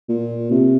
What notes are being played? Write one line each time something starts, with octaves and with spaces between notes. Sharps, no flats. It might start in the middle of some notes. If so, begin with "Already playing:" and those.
A#2
C3